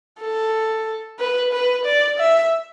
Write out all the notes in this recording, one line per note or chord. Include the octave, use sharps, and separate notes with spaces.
A4
B4
B4
D5
E5